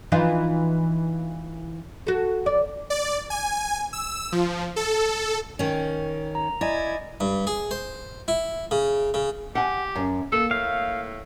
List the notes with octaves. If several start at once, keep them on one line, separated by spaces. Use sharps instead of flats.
E3 D#4 F4
F#4 A4
D5
D5
G#5
E6
F3
A4
D#3 C#4
A#5
E4 D5 D#5 G#5
G2
G#4
C5
E4
C#3
C#3
G4 F#5 G#5
F#2
A#3 A4
A2 F5